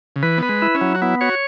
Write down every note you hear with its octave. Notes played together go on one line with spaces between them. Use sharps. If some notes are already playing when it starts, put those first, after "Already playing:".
C#3
E3 B4
B3 B4
G#3
E4
C#4
F#3
F#4
B3 E4
F#4 C#5